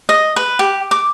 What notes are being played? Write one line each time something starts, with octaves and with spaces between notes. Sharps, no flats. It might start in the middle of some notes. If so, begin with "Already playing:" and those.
D#5
B4
G4
D6